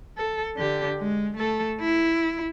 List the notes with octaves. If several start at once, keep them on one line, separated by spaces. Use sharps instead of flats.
A4
D3 G4
G#3
A3 A4
E4